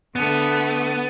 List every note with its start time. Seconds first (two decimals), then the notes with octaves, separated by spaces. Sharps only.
0.16 D3 A3 B3